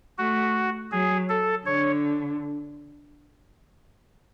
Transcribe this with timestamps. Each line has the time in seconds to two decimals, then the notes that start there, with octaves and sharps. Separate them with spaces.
0.18 A3 F#4
0.92 F#3 G#4
1.29 A4
1.66 D3 C#5